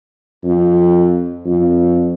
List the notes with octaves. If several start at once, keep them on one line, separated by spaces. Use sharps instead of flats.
F2
F2